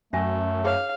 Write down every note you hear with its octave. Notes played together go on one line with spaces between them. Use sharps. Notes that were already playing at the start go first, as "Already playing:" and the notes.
F#2 A3 C#4 E5 G#5
G#4 C#5 F5